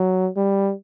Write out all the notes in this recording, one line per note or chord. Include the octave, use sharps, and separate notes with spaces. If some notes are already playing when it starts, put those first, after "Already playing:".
Already playing: F#3
G3